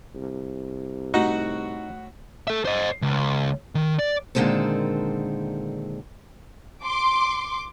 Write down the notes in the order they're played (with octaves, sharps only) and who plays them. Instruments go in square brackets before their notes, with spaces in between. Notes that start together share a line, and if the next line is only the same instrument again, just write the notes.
[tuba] C2
[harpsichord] A2 F#5 [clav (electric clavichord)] D#4 [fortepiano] F#4
[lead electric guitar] A4 E5
C5 D#5
C#2
D#3
D5
[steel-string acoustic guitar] A#2 D3 D#3 G#3 C4 A4
[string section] C6 D6